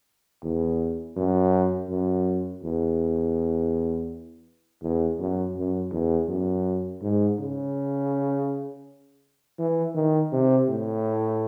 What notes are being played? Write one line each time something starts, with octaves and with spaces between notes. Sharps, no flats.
E2
F#2
F#2
E2
E2
F#2
F#2
E2
F#2
G#2
C#3
E3
D#3
C3
A2